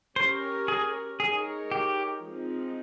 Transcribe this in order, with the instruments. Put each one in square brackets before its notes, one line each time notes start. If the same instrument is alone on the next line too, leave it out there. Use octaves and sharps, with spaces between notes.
[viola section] C#4 G4 A#4 C#5 [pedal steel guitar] C5
[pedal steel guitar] G#4
[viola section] G#3 D#4 A#4 C#5 [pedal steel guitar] G#4
[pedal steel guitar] G4
[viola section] F3 G#3 C4 D#4